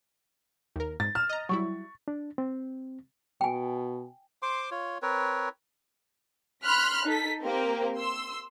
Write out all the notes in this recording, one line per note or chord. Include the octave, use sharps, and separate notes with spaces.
D#2 A#4
G#2 A6
F6 E7
D#5 A#5
F#3 G3 E4 C#6
D4
C4
B2 G5 G#5
C5 C6 D6
F4 C#5
C4 A#4 B4 C#5
B5 C6 F6 F#6 B6
D#4 A4 B6
A#3 C4 G4 A#4
C6 E6